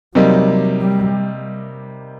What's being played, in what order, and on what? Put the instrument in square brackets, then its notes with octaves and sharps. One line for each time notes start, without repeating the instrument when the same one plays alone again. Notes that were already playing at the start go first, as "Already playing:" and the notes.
[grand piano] C3 G3 A#3 D#4 [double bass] F#3
[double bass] G3